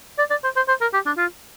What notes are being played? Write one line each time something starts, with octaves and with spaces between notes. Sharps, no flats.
D5
D5
C5
C5
C5
A#4
G4
D4
F4